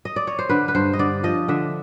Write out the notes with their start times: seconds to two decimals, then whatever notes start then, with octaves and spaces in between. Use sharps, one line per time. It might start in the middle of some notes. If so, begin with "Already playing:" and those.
0.05 D#5
0.16 D5
0.27 C#5
0.39 C5
0.49 D3 B4
0.68 B4
0.75 G2 C5
0.93 D#5
0.99 D3 D5
1.23 F3 D#5
1.48 D3 E5